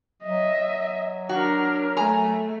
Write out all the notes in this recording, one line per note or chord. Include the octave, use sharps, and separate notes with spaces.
F#3 D#5 E5
D4 F#4 A#4
A3 G#5 A#5